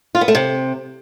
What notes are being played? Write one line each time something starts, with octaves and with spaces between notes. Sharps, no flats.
F4
B3
A3
C3